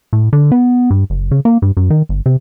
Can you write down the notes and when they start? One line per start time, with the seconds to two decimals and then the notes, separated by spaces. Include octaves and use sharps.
0.13 A2
0.33 D3
0.52 B3
0.90 G2
1.10 F#1
1.31 C#3
1.45 A#3
1.62 G2
1.77 F#2
1.90 D#3
2.09 G1
2.26 C3